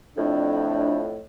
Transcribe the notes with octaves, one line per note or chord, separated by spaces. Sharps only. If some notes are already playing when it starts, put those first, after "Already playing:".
F2 A2 D4